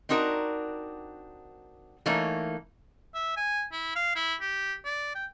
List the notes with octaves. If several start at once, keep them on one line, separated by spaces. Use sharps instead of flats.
C4 D4 D#4 F#4 A#4
E3 A3 A#3 D#4 C#5
E5
G#5
E4
F5
E4
G4
D5
G5